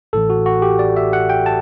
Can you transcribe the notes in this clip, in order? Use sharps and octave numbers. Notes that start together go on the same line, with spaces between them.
A1 A2 E3 A4
F#4
F#4
G4
D5
E5
F#5
G5
A5